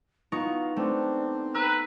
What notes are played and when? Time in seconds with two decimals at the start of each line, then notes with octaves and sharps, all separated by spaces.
0.32 B3 D#4 F4 C#6
0.76 A3 C4 D4
1.55 B4 A#5 E6 F#6